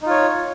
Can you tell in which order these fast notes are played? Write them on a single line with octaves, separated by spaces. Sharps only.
D#4 F4 C#5